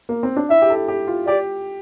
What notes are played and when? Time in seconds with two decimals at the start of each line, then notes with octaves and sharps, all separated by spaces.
0.09 A#3
0.23 C4
0.37 D4
0.50 E4 E5
0.62 G4
0.70 A4
0.88 G4
1.08 F4
1.27 G4 D5